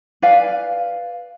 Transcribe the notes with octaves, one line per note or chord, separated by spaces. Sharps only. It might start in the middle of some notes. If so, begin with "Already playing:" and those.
B4 D5 F5 G#5